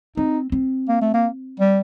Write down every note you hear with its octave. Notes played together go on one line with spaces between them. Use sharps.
C4 D#4
C4
A#3
A3
A#3
G3